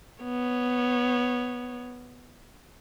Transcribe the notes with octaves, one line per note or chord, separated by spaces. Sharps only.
B3 C#5